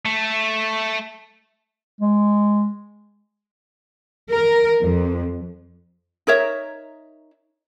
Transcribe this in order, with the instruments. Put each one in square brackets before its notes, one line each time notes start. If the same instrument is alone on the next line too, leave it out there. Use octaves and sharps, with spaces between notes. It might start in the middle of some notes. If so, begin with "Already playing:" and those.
[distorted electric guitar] A3
[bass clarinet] G#3
[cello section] A#4
F2
[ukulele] D#4 A#4 C#5 E5